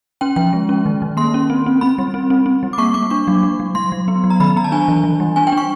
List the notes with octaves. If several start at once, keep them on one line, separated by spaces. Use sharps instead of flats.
C#4 G5
F3 G5
G#3
C#4
D#3
D#3
A#3 C6
C#4
C4
C4
C4 B5
G3
C4
C4
C4
G3
D6
A#3 C#6
A#3 D6
D4 C#6
F#3
F#3
F#3
F#3 C6
F#3
B3
F#3
A#5
D#3 B5
B3 A#5
A5
D4 G#5
E3
E3
G3
D4 G#5
G5
D4
C#6